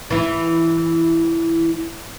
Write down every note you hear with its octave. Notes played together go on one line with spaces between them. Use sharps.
E3 E4